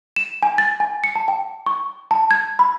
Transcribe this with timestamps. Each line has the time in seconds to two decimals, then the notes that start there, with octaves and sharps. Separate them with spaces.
0.16 E7
0.43 G#5
0.58 A6
0.80 G#5
1.04 C#7
1.16 A5
1.28 G5
1.66 C#6
2.11 A5
2.31 G#6
2.59 B5